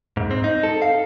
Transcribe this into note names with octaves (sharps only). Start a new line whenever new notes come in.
G#2
C4
D#4
A4
F5